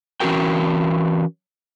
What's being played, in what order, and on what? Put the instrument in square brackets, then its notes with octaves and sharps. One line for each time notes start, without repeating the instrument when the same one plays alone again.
[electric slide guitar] E3 C#4 E4 F#4 A#4 G5